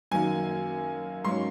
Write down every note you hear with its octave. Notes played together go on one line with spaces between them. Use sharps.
F#2 D#3 F#3 A#3 G#5
G#2 F#3 A#3 C#4 C6